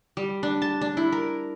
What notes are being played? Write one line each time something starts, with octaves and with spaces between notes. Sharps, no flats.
G3
D4
A5
D4
E4
A#4